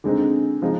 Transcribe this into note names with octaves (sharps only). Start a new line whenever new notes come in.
D3 G#3 C4 D#4
F3 G#3 D#4